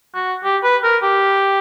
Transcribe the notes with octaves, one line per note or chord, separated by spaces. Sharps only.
F#4
G4
B4
A#4
G4